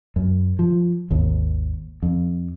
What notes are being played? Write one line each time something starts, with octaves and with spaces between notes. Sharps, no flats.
F#2
F3
G#1 D#2
F2